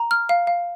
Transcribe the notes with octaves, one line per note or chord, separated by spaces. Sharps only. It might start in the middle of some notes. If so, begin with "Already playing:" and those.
Already playing: A#5
F6
F5
F5